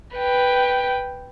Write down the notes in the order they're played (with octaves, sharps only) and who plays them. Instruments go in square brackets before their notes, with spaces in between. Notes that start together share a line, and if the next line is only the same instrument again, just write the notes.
[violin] B4 G5